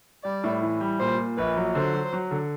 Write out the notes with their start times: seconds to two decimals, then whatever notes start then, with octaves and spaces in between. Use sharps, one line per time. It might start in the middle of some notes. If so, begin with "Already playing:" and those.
0.24 G3 D5
0.44 A2
0.62 E3
0.81 G3
0.99 A#2 C5
1.18 A#2
1.37 A#1 B4
1.57 F#3
1.75 D3 C5
1.93 F#3
2.13 F#3
2.31 D3